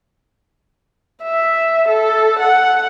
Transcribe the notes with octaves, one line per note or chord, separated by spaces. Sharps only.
E5
A4
F#5